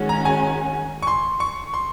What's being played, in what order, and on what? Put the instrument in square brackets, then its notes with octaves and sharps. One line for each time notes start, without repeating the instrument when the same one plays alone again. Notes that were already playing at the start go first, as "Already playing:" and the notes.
Already playing: [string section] D#3 G#3 C#4 F#4
[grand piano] A#5
G#5
C#6
C6
C#6
C6